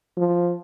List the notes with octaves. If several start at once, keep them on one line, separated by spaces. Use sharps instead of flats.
F3